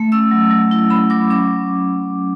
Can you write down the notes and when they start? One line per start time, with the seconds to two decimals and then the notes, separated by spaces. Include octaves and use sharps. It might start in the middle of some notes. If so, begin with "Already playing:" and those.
Already playing: A3
0.12 C#4 E6
0.31 F#3
0.51 F#3
0.71 E4
0.90 C#4 B5
1.10 F#3 D6
1.30 C#4 D6